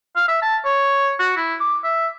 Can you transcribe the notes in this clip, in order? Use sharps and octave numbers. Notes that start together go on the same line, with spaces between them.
F5
E5
A5
C#5
F#4
E4
D6
E5